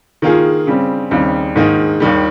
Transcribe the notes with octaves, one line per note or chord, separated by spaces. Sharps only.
D#3 A#3 F4 G#4
C#3 G3 C4
D#2 C#3 G3 C4 D#4
G#2 D#3 A#3 D#4 G#4
D#2 D#3 G3